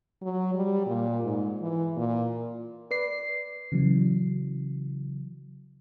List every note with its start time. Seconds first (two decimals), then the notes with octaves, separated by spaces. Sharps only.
0.22 F#3
0.55 G3
0.87 A#2
1.23 G#2
1.62 E3
1.96 A#2
2.91 B4 D5 C7
3.72 C#3 E3 F#3